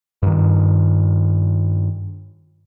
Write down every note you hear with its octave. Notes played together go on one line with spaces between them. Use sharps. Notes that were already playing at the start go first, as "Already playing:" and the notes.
G2 D#3